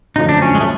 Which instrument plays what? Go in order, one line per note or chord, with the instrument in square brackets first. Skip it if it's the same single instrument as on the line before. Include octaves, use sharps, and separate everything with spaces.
[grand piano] F#2 D3 F3 A3 [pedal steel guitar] D#4
[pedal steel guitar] D4
C#4
G#3
A3